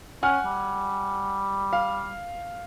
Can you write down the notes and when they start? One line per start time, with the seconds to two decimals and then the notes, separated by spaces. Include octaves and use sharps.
0.23 C#4 F#5 G#5 F6
0.45 G3
1.73 F5